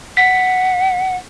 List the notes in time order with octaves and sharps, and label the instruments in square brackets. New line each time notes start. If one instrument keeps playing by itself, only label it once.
[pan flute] F#5 [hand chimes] B6